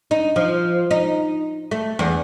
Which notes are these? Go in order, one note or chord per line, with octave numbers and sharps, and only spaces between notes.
D#4
F3
D#4
A3
E2